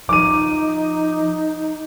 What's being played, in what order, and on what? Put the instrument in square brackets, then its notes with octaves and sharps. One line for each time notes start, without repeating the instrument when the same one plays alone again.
[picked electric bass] F3 [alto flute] D#4 [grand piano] D6 D#7